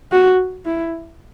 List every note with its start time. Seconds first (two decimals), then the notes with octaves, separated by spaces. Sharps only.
0.12 F#4
0.66 E4